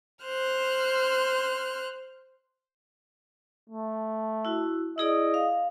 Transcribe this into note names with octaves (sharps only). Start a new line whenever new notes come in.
C5 F6 F#6
A3
E4 F#4
E4 G#4 D5 D#5
F5